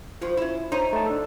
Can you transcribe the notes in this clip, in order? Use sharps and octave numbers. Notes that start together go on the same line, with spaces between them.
D#2 F3
C#4 E4
D#4 C5 C#5
A3 A5
D4 A4